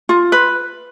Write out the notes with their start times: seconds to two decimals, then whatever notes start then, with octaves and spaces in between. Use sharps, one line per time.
0.09 F4
0.32 B4